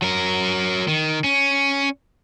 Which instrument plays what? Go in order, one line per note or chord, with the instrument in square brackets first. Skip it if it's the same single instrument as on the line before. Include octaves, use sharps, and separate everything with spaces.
[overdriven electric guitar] F#3 A#4
D#3
C#4